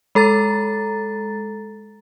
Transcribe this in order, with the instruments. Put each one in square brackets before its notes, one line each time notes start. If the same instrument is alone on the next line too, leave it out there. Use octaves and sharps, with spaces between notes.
[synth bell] G#3 A4 A#5 A6